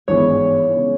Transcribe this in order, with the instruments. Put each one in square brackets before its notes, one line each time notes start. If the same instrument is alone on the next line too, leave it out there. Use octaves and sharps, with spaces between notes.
[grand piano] G#1 G2 E3 G#3 B3 [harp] C#5
[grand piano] C#3 G#3 B3